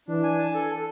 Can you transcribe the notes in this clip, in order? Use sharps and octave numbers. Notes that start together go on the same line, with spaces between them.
E3 D4
G#5
A5
A4
A4